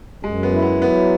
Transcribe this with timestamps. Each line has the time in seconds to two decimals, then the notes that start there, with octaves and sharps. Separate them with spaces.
0.23 F#2 G#3
0.43 B3
0.52 E4
0.62 B3
0.82 F#3 B3